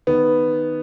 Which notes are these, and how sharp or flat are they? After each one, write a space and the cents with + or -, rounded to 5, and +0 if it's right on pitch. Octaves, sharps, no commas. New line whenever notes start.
D#3 +0 B3 +0